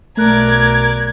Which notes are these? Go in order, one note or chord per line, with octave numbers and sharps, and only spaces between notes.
B1 A3 A#4 D5 F#6 G#6